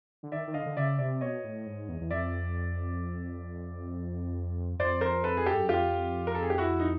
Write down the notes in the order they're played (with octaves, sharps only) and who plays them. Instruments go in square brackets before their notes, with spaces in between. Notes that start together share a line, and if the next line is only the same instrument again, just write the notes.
[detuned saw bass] D3
[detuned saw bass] D#3 [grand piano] D5 E5
[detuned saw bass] D#3
[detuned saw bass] D3 [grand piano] D#5 F5
[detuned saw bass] D3
[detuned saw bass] C#3 [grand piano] D5 E5
[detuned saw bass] C3 [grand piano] D5 E5
[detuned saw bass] B2 [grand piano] C#5 D#5
[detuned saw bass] A2
G#2
E2
E2
[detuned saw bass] F2 [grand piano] D5 E5
[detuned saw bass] F2 [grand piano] C5 D5
[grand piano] A#4 C5
A4 B4
G#4
G4 A4
[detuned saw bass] G2
F#2
[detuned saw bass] F2 [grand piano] F4 G4
[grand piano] A#4
A4
G#4
G4
E4 F#4
D#4